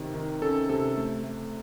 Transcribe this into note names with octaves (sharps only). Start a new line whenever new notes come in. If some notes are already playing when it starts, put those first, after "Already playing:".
Already playing: C3 D#3
D#3
C#4 A4
C3 A4
A3
A3